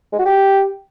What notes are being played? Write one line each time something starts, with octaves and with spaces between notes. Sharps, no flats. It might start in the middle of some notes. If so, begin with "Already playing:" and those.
G#3
F#4
G4